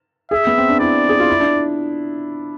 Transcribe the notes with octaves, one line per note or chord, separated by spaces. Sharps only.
G#4 E5
B3
C4
D4
E4 D5
G#4
F4
E4
D4